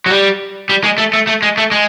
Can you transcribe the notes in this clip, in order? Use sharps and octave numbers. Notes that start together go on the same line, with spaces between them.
F#3
G3
G3
G#3
A3
A3
A3
G#3
A3
G#3